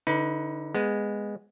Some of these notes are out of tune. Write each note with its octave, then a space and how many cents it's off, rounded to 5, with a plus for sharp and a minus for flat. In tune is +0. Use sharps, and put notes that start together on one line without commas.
D3 +0 D#4 +30 B4 +0
G#3 -10 B3 +0